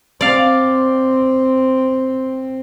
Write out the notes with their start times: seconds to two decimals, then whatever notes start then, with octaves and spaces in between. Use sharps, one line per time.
0.21 C4 D5 F5